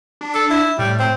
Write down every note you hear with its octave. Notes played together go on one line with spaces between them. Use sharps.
D4
A4
E4
A2 G3
C4